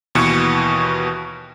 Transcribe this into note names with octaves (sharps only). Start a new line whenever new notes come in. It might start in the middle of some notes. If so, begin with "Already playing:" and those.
D#2 B2 E3 C#6 C#7